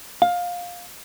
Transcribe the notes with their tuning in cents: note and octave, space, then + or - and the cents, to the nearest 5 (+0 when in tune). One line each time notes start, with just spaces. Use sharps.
F5 +20